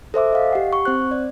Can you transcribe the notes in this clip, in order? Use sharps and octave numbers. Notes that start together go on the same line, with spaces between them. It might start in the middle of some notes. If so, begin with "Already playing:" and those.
A4 C5 E5 D6
D#5 F5
G4 F#5
C#6
C4 C5 F#6
D5